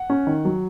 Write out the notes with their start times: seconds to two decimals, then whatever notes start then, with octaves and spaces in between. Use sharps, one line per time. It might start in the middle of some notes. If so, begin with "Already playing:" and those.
Already playing: F#5
0.10 C#4
0.27 D#3
0.45 F#3